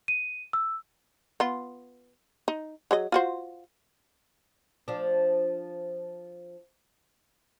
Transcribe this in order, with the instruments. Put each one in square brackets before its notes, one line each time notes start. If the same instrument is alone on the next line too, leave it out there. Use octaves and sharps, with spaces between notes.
[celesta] D#7
E6
[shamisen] B3 F4
D#4
F#3 G#4 D#5
F4 F#4 C5
[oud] F3 D4